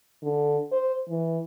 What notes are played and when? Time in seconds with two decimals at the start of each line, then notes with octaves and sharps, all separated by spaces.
0.23 D3
0.72 C5
1.09 E3